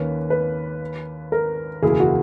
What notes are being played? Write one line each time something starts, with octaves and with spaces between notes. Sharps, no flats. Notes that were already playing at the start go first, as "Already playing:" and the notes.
Already playing: D#2 D#3 A#3 C#4 B4
B4
A#4
F#1 E2 B2 A#3 E4 G#4
F#4